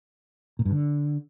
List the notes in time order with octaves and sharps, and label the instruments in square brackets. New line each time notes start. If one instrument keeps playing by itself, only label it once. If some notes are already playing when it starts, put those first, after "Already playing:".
[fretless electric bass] A#2
G2
D3